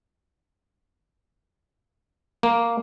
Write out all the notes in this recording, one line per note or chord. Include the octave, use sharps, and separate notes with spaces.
A#3